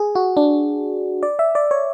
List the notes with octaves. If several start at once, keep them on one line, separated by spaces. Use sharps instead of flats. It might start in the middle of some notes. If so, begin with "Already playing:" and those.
Already playing: G#4
F#4
D4
D5
E5
D5
C#5